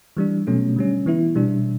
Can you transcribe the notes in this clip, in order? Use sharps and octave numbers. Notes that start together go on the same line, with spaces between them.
E3 G3 D4
B2 F#3 A3 C#4
D3 G3 C#4
E3 B3 E4
B2 G3 D4